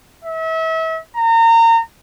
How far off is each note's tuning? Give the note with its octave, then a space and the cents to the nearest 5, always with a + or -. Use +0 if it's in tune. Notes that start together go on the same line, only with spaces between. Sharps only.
E5 -35
A#5 -30